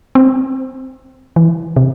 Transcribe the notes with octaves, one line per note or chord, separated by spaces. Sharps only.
C4
E3
C3